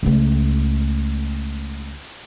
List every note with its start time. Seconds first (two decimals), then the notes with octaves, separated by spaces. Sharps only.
0.03 C#2 A3